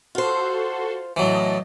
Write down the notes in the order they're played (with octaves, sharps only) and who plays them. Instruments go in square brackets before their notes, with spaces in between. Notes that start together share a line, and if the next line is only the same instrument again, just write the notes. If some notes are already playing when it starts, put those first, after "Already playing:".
[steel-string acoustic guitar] F4 C5 [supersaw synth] F#4 A4 C6
[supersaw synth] A2 D#5 A5 [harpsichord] E3 F#3